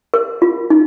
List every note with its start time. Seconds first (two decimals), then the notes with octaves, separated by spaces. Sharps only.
0.14 A#4
0.42 F4
0.70 D#4